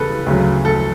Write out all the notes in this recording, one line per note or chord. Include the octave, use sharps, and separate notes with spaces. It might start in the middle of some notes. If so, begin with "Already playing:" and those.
Already playing: E2 C#3 G3 A4 B4
D2 C#3 F#3
A4